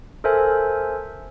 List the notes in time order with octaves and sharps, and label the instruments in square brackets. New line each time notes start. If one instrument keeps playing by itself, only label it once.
[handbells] A4 A#4 C5 E5 G#5